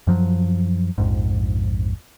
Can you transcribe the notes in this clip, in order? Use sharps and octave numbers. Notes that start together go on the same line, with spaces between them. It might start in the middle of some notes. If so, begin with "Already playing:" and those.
F#2 F3 F#3
A#1 F2 G#2